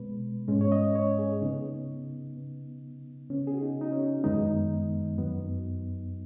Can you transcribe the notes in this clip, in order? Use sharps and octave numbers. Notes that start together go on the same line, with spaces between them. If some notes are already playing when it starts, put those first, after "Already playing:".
Already playing: B2 G#3 B3 B4
G#2 G#3 C#4
C#5
D#5
C#5
G#4
C#3 B3 D#4
C#3 B3
C#3 B3 C#4
G#4
F#4
D#4
D#4
C#4
F#2 D#3 G#3 B3 D#4
F#2 F#3 B3